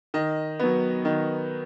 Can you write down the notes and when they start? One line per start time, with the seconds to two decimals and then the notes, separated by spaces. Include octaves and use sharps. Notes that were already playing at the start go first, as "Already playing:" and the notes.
0.14 D#3 D#5
0.60 F#3 B3
1.05 D#3